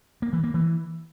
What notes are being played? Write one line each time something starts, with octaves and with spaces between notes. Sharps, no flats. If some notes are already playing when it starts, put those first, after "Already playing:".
A#3
E3
A#3
E3